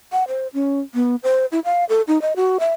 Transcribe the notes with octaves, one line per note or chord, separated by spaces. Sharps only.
F#5
C5
C#4
B3
C5
E4
F5
A4
D#4
D#5
F#4
E5